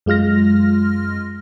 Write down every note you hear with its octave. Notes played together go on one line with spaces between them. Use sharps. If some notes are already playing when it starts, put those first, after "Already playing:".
F#2 G#3 F4 F6 A#6